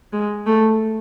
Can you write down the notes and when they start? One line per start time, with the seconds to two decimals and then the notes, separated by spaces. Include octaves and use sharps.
0.13 G#3
0.46 A3